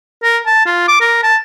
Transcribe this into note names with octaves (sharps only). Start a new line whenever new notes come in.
A#4
A5
F4
D6
A#4
A5